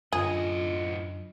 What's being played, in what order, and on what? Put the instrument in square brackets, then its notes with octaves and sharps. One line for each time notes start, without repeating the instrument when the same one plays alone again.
[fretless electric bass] F#2 D3 [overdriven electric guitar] A2 D#5 [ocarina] F4 [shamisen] G#4